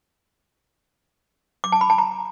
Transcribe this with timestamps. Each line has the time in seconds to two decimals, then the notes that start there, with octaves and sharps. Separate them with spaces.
1.64 D6
1.72 A5
1.81 B5
1.90 A5
1.98 A#5